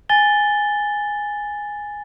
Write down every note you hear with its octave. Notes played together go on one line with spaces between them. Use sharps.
G#5 A6 G7